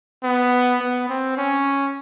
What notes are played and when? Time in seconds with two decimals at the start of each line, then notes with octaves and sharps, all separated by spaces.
0.23 B3
0.80 B3
1.09 C4
1.37 C#4